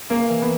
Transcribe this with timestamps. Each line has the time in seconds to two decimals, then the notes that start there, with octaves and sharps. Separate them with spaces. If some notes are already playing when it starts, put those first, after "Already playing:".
0.10 C#3 A#3
0.29 E3
0.42 B3